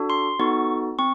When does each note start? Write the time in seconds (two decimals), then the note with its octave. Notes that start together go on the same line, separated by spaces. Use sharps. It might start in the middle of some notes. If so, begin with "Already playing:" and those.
Already playing: D4 F#4 A4
0.10 C6
0.39 B3 D#4 F#4 A4 C#6
0.99 C4 C#6